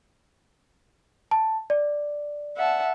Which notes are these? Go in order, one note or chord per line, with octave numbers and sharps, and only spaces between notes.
A5
D5
E5 F#5 A5